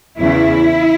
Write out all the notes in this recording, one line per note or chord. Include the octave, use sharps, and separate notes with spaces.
E2 C#3 E3 E4